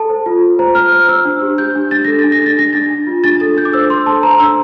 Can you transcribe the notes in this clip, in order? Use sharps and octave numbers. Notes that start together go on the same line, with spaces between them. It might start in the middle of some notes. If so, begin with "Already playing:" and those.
Already playing: A4 A5
C5
F4
F4
C5 A#5
C5 F6
C5 F6
C5 E6
D4
G4
G4 G6
D4
D4 A6
A4 A#6
A6
D4
A#6
D4 A6
D4 A#6
D4 A6
D4
F4
D4 A6
A4 A6
D4 G6
D6
C5 E6
D4 C6
A4 A5
C5 A#5
D4 E6